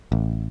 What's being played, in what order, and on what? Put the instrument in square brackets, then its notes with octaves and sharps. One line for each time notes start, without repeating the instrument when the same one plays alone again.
[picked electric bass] A1